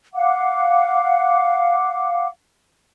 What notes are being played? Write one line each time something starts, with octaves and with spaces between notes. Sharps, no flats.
F5 F#5 D6